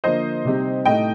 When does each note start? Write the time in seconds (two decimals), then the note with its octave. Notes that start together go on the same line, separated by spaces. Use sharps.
0.04 D3 F3 A#3 C5 D#5
0.45 C3 G3 C4 D#4 G4
0.85 A2 A3 D#4 D#5 G5